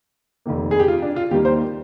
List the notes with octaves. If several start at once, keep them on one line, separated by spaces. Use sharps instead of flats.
F1 F2 D#3 A#3
G#4
G4
F4
D4
F4
D#2 D#3 G3 A#3 G4
C5